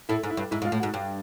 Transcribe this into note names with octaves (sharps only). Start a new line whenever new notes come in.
A2 E4
G#2
E4
G2
G#2 E4
G#2
F4
A2
F#4
G#2
G2